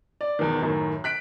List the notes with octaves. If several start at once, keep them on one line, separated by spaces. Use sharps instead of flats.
D5
E2 B2 D#3
F#2 A2 D#3
F#6 B6 D7